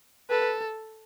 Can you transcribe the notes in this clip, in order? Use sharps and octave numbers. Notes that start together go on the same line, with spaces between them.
A4 B4